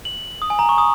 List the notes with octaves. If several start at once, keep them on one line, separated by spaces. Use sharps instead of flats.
F#7
D#6
G#5
A#5
C#6
D#6